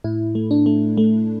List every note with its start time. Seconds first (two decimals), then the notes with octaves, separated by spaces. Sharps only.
0.04 A2 E4
0.35 A3
0.51 D4
0.66 A3
0.97 A3